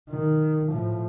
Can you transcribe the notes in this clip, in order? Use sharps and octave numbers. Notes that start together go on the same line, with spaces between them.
D#3
A2 F3